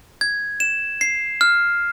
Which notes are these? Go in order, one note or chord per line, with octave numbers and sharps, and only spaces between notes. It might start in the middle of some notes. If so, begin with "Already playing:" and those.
G#6
E7
C7
F6